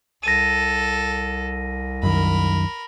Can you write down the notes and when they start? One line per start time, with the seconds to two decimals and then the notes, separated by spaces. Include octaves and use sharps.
0.23 C2 A4 A#6 D#7
2.03 F#2 D#3 A#4 B5